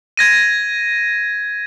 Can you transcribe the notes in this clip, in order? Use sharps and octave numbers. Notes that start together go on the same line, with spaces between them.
G#6 A#6 D#7